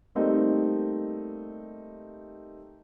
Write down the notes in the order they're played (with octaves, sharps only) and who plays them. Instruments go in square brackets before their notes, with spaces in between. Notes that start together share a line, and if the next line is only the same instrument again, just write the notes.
[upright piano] G3 A3 A#3 C4 D#4